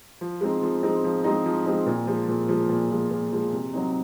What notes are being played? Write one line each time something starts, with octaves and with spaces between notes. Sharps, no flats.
F3
G#3 C4 D#4
F3
G#3 C4 D#4
F3
G#3 C4 D#4
F3
G#3 C4 D#4
A#2
F3 G#3
A#2
F3 G#3
A#2
F3 G#3
A#2
F3 G#3
C3
F#3 C4 D#4